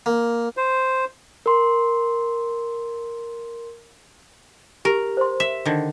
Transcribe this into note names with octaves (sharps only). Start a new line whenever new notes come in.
A#3
C5
A#4 C6
G4 A#4
C5 C6
E5
D3 D#3